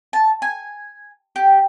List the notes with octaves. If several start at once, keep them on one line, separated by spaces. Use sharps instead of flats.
A5
G#5
G4